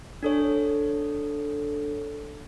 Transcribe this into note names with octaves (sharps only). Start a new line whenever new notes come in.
D4 A4 C#5